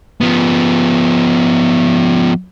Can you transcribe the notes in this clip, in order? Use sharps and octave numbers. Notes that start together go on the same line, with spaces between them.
F3 B3